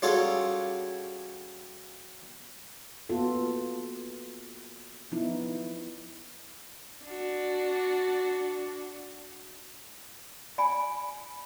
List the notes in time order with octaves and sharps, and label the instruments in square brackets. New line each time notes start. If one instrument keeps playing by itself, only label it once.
[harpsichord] G3 C#4 F4 F#4 G#4 A4
[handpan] A#3 B3 F4 F#4 A4
F3 B3 D#4 E4
[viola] D4 F#4
[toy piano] D5 G5 G#5 B5